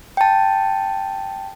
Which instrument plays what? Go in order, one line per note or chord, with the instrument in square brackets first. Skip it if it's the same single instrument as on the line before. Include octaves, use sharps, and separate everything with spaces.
[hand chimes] G5 A5